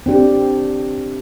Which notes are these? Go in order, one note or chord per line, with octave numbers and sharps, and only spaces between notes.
C4 D4 G4